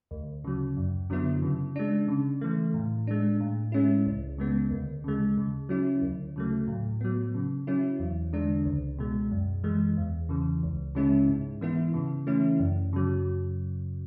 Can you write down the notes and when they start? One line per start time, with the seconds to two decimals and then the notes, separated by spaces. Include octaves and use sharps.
0.11 D2
0.44 C#3 F#3
0.77 F#2
1.10 D3 F#3 B3 E4
1.42 C#3
1.76 G#3 D4
2.08 C#3
2.41 E3 A3
2.74 A2
3.07 G#3 D4
3.40 A2
3.72 G#3 C#4 E4
4.06 C#2
4.38 C#3 G#3 B3
4.71 D2
5.04 C#3 G#3
5.37 C#3
5.69 F#3 C#4 E4
6.02 D2
6.36 C#3 F#3 A3
6.68 A2
7.01 F#3 B3
7.34 C#3
7.67 F#3 C#4 E4
8.00 E2
8.33 D3 G#3 D4
8.65 C#2
8.98 B2 G#3
9.31 F#2
9.64 E3 G#3
9.97 E2
10.29 C#3 E3
10.63 C#2
10.95 C#3 G#3 C#4 E4
11.28 G#2
11.61 E3 B3 E4
11.94 C#3
12.27 E3 A3 C#4 E4
12.59 F#2
12.93 C#3 F#3